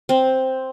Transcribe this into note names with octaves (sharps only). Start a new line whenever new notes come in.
C4